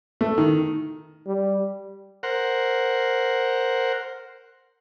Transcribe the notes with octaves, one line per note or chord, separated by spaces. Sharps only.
A3
D#3
G3
A#4 C5 F#5